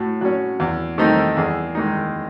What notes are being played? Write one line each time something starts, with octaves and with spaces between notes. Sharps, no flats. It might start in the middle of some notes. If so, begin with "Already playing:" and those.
Already playing: A2 F#4
F#3 C#4
E2
D#3 A3 C4 D#4
E2 G#4
D#3 G#3 D#4